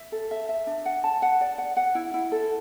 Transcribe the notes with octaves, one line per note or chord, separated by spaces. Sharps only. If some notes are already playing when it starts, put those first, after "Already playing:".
Already playing: E5
A4
E5
E5
D4
F#5
A5
F#5
D5
F#5
F#5
E4
E4
A4